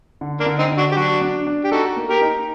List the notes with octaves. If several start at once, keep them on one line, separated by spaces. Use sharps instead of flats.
D3
A#3 D4
D3
C4 D#4
D3
D4 F#4
G4
F#3 D4 F#4
D4
D4
G4
D#4 F#4 A4
A#3
G4 A#4
D#4